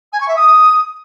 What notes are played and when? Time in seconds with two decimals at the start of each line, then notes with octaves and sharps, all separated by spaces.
0.12 G#5
0.20 C#6
0.28 E5
0.36 D#6